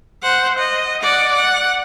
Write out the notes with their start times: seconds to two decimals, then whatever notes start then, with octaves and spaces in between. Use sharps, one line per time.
0.23 C5 F#5
0.58 D#5
1.02 D5 F#5
1.34 F#5